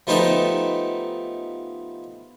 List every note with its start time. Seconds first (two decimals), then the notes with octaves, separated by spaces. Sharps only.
0.07 F3 A3 B3 D#4 G4 A4